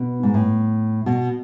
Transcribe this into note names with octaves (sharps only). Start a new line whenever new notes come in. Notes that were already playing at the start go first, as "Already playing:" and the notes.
Already playing: B2
G#2
A2
B2